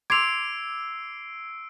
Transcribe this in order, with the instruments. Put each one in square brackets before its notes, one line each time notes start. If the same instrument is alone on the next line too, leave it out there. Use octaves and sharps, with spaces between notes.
[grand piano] C6 D6 [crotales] E6 C7 D7 [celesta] G#6 F7